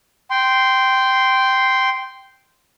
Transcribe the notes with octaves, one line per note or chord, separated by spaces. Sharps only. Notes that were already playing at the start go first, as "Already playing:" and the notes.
G5 C6